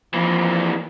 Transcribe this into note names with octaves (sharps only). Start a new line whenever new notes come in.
E3 F3 A#3